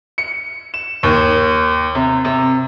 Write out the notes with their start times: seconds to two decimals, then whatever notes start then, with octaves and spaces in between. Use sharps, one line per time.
0.18 C#7
0.74 E7
1.03 D#2
1.95 C3
2.25 C3